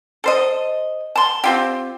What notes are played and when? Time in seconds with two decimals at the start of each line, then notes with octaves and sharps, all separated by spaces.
0.24 A4 C5 D#5
1.15 A5 C6
1.44 C4 F4 G4